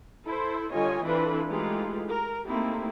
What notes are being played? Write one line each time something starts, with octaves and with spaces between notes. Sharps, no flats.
E4 A4 C5
D3 G3 F4 C#5 D#5 G#5
E3 C4 D4 F4 A4 B4
E3 G#3 A3 D#4 F4 G4
A#4
A3 A#3 C4 D#4 E4 G4